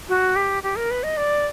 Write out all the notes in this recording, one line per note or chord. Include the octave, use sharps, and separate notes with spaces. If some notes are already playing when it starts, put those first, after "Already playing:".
F#4
G4
G4
A#4
B4
D#5
D5